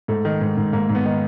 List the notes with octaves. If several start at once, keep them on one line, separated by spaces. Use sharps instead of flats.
G#2 A3
D#3
G#2
G#2
G#2 A#3
G#2
B3
D#3